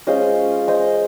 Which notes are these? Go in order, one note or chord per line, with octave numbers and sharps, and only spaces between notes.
G#3 C#4 F4 C5 D#5
C5 D#5